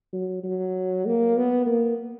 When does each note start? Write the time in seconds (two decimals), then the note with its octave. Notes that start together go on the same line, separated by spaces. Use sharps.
0.13 F#3
0.44 F#3
1.06 A#3
1.37 B3
1.67 A#3